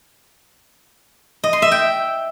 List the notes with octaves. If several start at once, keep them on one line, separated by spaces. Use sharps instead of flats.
D#5
C6
E5
G5